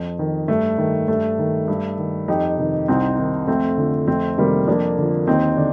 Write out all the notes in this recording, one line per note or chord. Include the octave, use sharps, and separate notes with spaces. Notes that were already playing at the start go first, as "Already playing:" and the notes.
Already playing: F2
D#3
G2 A3
D#3
G2 A3
D#3
G2
D#3
F2 D#4 G4
C3 D#3
C2 C4 D#4
C3 D#3
F2 A3 C4
D3 F3
F2 A3 C4
C3 D#3 G3 A#3
F2 A#3 D4
D3 F3
D#2 C4 D#4
D3 D4